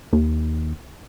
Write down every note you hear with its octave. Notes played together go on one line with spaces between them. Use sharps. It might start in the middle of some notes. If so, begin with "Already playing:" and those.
D#2